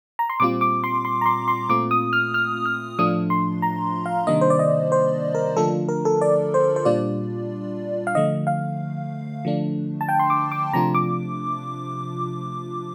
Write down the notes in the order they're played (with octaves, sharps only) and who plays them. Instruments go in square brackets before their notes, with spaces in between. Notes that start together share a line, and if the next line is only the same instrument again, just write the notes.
[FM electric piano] A#5
C6
A#2 G3 C4 F4 D6
D6
C6
C6
A#5
C6
C6
A#2 A3 C4 F4 D6
D#6
F6
F6
F6
A2 F3 A3 D4 F4 D#6
C6
A#5
F5
C3 D#3 G3 A#3 D4 D#5
C5
D5
D#5
C5
A#4
D3 F3 A3 D4 F4 A4
A#4
A4
D5
C5
C5
A#2 G3 D4 F4 D5
F5
D3 F3 A3 D#5
F5
D3 F3 A3 D4
A5
G5
C6
D6
D6
C3 F3 A3 D4 F4 A#5
D6